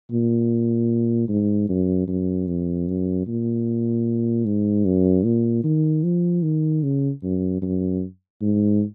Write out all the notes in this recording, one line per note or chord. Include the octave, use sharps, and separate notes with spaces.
A#2
G#2
F#2
F#2
F2
F#2
A#2
G#2
F#2
A#2
D#3
F3
D#3
C#3
F#2
F#2
G#2